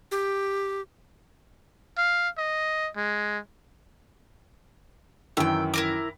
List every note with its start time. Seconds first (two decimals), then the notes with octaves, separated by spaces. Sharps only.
0.11 G4
1.98 F5
2.38 D#5
2.96 G#3
5.37 F#2 D#3 E3 G5 E6
5.74 E4 A#4 D6